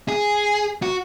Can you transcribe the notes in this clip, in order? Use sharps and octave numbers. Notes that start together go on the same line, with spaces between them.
G#4
F#4